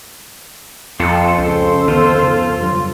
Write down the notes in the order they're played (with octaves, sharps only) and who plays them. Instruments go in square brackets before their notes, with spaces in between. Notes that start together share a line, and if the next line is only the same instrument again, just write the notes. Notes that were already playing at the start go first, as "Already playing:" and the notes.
[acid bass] F2 [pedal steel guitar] C4 F4 A4
[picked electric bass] C#2 [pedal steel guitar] C#3 [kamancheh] A4 C5
[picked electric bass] D#3 B3 [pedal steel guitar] F4
[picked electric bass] F2 C#3
G2 F#3